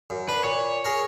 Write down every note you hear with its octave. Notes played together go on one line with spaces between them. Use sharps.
F#2
D4 B4
A#2 C#5
G#4 A#4